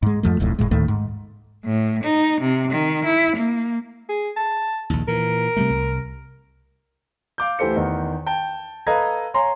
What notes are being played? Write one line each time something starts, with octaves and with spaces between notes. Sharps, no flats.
G#2 G#3
F2 F3 A3
D1 B1 F2 A2
F#1 D#2 A2 G#3
D2 A2 D#3 A3
G#2
A2
D#4
C3
D#3
E4
A#3
G#4
A5
A#1 D#2
A#2 E3 A#4
C3 G3 A3
C2
F5 D6 G6
D2 E3 G4 A4 C5 C#7
E2 D#3
G5 A5
A4 B4 D#5 F5 A#5 G#6
C#5 F5 G#5 A#5 C6